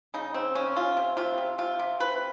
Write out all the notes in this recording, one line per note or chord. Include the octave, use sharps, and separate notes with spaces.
C#3 D#4
C#3 C4
C#3 C#4
C3 F4
C3
C3 F4
C3
C3 F4
C3
C3 B4